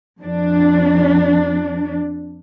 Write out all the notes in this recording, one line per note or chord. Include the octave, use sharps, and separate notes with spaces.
F2 D4